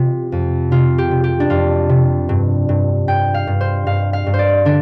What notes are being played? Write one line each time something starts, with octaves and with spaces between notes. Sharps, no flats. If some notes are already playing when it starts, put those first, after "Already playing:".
Already playing: C3 F4
F2
C3 F4
G4
C3
G4
D4
F2 F4
C3
G2
G2
G2 G5
F5
G2
C5
G2 F5
F5
G2
C5
D5
D3 D4